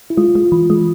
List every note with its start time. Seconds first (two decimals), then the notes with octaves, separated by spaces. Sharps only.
0.10 E4
0.17 G#3 F4
0.35 G#3
0.52 E3
0.70 G#3